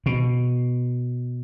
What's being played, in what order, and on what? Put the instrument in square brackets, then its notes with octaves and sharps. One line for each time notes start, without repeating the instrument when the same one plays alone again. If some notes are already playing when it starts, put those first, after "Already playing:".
[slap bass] B2